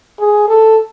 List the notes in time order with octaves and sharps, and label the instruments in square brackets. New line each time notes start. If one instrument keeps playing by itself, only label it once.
[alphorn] G#4
A4